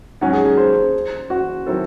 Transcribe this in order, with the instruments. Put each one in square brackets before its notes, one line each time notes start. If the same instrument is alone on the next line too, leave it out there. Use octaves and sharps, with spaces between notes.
[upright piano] G#2 F#3 C#4 [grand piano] F#5
[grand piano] G#4
G#4
C5
F#4
[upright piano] D#3 F#3 C4 E4 A4